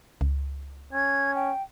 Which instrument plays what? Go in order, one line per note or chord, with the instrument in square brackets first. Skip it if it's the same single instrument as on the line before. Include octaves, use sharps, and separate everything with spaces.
[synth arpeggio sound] C#2
[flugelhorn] C#4 [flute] G#6
[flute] G5